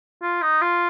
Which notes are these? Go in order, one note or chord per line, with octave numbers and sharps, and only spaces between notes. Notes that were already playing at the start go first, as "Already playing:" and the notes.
F4
D#4
F4